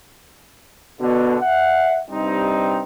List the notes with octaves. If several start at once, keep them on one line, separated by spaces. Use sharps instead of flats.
B2 D3
E5 F#5
G2 C3 G3 C4 D#4